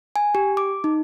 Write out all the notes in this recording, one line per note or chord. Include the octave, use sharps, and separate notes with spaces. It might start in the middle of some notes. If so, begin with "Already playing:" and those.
G#5
G4
D6
D#4